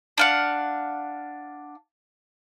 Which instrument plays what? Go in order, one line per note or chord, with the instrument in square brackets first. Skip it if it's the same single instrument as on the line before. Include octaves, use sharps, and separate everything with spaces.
[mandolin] D4 F5 F#5